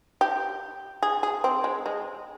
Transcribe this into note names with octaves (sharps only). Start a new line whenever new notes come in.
G4
G#4
G#4
C4
G#3
G#3